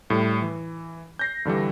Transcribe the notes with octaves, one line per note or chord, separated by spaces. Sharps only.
A2 G3
E3
G6 A#6 C7
G2 D3 E3 G3